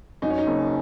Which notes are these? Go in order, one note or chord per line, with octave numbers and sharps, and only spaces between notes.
F#2 D#4
C#4
D#4
F#1